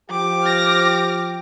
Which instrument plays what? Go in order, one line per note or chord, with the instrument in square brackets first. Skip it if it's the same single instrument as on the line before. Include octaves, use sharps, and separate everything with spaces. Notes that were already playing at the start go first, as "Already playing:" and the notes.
[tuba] F3 [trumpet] G4 [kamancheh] D6
[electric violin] F6 A#6